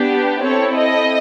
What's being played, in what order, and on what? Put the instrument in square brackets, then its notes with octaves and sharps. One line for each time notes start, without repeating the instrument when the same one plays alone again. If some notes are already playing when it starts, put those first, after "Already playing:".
Already playing: [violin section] B3 D4 G4
C4 E4 A4 C#5
D#5